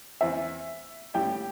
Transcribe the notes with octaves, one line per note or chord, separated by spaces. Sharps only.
E2 E3 C4 E5
A2 G3 E4 G4 G5